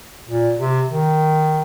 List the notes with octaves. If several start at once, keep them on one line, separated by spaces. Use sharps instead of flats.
A#2
C3
D#3